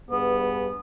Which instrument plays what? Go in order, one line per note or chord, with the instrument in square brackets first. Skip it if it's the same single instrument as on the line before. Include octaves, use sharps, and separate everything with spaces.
[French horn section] G2 G#4 B4 [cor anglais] B3